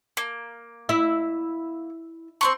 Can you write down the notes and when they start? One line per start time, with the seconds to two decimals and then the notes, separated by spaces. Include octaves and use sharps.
0.17 A#3
0.89 E4
2.41 C4 C6 C#6